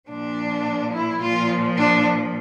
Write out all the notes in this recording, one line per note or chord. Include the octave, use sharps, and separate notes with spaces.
A#2 F3 D4
E4
A#2 F3 F4
D4